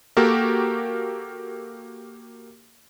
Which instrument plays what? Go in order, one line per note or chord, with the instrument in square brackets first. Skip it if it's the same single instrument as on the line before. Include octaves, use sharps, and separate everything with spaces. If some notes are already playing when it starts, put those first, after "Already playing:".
[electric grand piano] A#3 F#4 G4 A4 A#4